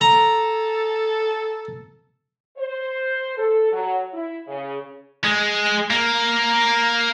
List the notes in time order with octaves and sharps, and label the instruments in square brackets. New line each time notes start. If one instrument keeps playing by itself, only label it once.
[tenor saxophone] A4 [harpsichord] A#5
[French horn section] C5
A4
F#3
E4
C#3
[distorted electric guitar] G#3
A#3